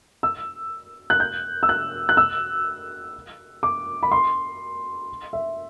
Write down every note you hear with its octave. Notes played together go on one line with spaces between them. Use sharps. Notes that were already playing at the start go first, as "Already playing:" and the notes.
E6
F#6
G6
E6
F#6
F#6
E6
D6
B5
C6
E5